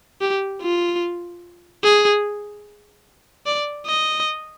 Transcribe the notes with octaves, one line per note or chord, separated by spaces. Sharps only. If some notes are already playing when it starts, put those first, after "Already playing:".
G4
F4
G#4
D5
D#5